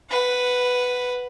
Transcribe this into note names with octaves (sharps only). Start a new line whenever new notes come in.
B4 F#5